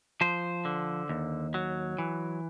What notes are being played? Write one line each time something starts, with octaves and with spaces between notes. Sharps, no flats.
F3 C5
D3
D#2
F#3
E3